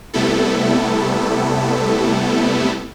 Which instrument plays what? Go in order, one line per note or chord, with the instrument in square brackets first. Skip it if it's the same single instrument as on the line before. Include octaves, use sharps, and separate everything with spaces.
[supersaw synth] C3 G3 A3 B3 E4 A4